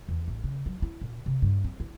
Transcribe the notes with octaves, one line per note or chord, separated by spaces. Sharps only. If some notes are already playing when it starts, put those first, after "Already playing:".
E2
A1
C#3
F#3
E4
A#2
C3
G2
C4
E4